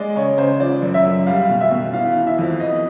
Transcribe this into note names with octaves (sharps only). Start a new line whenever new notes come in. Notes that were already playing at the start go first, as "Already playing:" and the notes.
Already playing: G#3 D5
C#3 C#5
C#3 C5
F3 D5
F#2
E5
F#2
G3 F5
B2
E5
B2
E3 F5
E3
E5
F2
B3 D#5